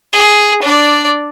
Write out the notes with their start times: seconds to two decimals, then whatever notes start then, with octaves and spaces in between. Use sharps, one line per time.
0.13 G#4
0.62 D4 D5